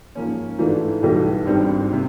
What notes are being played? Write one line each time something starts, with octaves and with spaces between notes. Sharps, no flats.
G#2 F3 A#3 C#4
G#2 E3 A3 D4 F4
B1 A2 E3 G3 B3
G#1 G2 D#3 G3 C4
C3